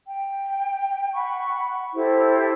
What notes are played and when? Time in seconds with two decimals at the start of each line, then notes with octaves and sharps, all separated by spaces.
0.07 G5
1.13 F#5 B5 C#6
1.95 E4 G4 A4 C5